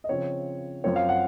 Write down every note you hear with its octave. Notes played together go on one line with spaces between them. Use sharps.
D#5
C#3 F3 C4 C#5
F#2 F3 C4 C#5
F5
F#5